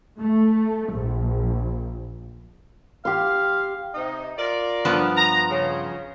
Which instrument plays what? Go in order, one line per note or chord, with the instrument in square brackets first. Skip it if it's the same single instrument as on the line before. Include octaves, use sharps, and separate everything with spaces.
[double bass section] A3
A#1
[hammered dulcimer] G4 C6 [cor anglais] F5
[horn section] C3 D#4
F4 A#4 D5
[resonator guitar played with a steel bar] G2 F3 B3
[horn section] A#5
C#3